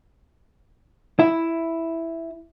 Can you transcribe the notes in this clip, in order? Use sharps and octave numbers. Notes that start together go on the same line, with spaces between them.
E4